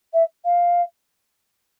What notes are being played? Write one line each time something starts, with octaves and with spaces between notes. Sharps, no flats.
E5
F5